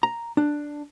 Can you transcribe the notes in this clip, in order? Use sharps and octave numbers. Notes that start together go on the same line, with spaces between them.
A#5
D4